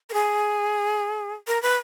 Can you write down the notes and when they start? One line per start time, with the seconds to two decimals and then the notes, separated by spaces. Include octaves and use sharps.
0.09 A#4
0.13 G#4
1.47 A#4
1.62 B4